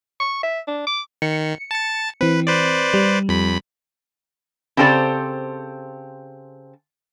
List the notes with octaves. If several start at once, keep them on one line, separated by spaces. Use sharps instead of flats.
C#6
E5
D4
D6
D#3 C#7
A5 A6
E3 C4 B4
B4 C5 D5
G3
F2 B5
C#3 C4 G4 A4 C5 D5